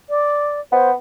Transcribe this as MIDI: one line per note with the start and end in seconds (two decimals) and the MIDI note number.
0.09 0.60 74
0.72 0.93 59
0.72 0.90 72